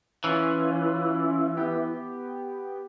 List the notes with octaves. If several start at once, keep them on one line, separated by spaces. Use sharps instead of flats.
E3 C#4 F4
B3 G4